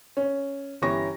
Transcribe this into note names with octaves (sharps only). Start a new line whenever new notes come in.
C#4
G1 E3 C#4 G4 C#6 A#6